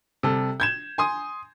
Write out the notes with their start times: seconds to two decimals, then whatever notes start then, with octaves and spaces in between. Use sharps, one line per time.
0.23 C3 G3 A4
0.60 G6 G#6 E7
0.98 G#5 C6 D#6